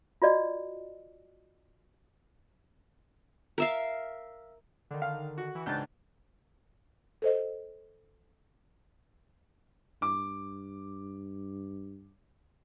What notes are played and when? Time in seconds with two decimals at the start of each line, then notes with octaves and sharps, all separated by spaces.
0.22 F4 F#4 D5 D#5
3.58 A#4 E5 F5
4.91 D3 D#3
5.02 F5
5.38 F#4
5.55 E3
5.66 C#2 G#2 D4 G6 A6
7.22 A4 C5 D#5
10.02 G2 D6